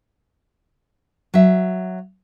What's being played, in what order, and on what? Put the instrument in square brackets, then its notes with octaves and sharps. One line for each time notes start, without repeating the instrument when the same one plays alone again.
[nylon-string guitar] F#3 E5